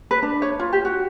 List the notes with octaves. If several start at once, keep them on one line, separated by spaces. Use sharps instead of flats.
B4
D4
C#5
F4
G4
F#4